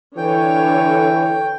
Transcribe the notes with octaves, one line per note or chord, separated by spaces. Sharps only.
D3 E3 C#5 G5